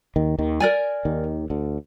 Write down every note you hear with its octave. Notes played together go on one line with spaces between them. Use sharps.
D#2 D#3
D#2 D#3
A#4 D5 G#5
D#2 D#3
D2 D3